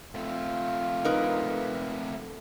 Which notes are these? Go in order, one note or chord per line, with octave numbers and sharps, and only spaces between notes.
A3 C4 F4
D#4 A#4 B4